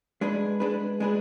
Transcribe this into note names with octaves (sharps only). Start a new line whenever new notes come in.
G#3 D4 G#4 B4
G#3 D4 G#4 B4
G#3 D4 G#4 B4